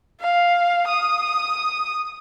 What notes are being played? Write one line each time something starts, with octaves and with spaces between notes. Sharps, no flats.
F5
D#6